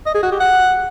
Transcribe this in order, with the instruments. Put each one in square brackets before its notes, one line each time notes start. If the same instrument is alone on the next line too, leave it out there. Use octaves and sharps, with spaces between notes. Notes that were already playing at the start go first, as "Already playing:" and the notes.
[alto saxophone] D#5
G#4
F#4
G4
F#5